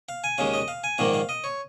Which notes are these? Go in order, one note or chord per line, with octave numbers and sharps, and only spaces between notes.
F5
G#5
D#2 C#3 G#3 F5
D#5
F5
G#5
A#1 G#2 D#3 A#3 F5
F5
D#5
C#5